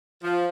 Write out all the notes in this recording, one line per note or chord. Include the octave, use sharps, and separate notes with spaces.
F3